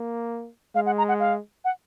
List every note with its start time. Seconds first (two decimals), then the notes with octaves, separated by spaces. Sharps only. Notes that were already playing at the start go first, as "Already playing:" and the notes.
Already playing: A#3
0.75 G#3 F5
0.86 F#5
0.98 A#5
1.09 F#5
1.20 F5
1.65 F#5